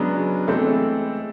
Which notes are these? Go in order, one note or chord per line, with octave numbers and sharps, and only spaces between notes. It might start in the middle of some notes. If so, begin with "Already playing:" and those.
Already playing: C#3 F#3 G#3 B3 D4
E3 G#3 A3 C4 A4